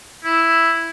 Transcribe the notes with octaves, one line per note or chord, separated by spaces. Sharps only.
E4